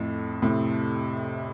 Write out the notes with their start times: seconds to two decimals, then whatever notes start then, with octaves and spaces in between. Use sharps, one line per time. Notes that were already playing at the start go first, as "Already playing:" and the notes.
Already playing: F2 A2
0.42 A2 C3